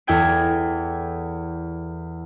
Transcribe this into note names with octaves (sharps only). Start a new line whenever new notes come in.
E2 E4 A4 G5 G#6 D7